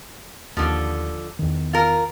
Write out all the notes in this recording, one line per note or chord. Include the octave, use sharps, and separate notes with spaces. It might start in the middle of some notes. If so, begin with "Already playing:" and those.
D#2 D3 F3
E2 D#3
F4 A#4